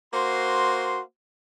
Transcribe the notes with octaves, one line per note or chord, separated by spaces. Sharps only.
A#3 F#4 C5 C6